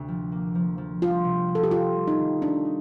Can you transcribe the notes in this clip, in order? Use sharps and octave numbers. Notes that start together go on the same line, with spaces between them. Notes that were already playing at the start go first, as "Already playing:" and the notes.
Already playing: D2 C3
F3
A#3
F3
F3
G3 F4
C3
A#3
A4
G4
G3 F4
G3
D#4
D#3
A3 D4
D#4